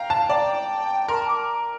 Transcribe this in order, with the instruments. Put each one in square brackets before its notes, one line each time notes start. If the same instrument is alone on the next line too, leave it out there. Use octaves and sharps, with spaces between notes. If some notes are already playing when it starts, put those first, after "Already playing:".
Already playing: [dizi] F5 [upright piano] G5 A#5
[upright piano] A5
[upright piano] D5 [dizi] G5
[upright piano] A#4 [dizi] C6
[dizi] A5
D6